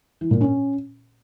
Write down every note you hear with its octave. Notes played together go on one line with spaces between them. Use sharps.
E3
A#2
C#4